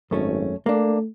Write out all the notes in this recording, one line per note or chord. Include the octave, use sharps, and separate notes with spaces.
G#1 F#2 A3 C#4
A3 A#3 D4